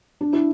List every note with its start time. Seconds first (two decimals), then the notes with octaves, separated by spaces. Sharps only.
0.21 D4
0.33 E4